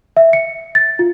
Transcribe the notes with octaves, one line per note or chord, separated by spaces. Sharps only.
E5
C#7
A6
F4